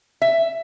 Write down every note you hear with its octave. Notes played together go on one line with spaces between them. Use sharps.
E5